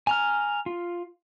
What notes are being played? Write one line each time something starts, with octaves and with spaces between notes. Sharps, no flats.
G#5 A#5 F6
F4